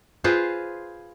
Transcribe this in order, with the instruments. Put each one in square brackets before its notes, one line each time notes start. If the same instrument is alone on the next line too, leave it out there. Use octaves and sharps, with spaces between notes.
[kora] F4 G#4 B4 C5